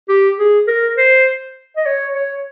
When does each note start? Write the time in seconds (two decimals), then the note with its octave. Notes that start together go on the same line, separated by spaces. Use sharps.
0.09 G4
0.38 G#4
0.67 A#4
0.98 C5
1.76 D#5
1.86 C#5
2.15 C#5